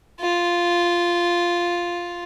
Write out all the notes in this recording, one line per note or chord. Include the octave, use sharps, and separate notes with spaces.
F4